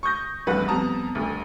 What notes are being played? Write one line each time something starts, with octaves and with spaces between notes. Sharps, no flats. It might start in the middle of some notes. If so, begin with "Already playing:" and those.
C#6 D#6 G6 A#6
F1 E2 G2 A3 B4 F#5
F2 G3 B3 A5 A#5 D#6
D#1 D2